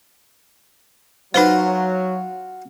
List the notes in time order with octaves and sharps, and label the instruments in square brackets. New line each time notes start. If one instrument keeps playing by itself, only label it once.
[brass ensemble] F#3 [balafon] D#4 B4 C5 [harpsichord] F4 F#4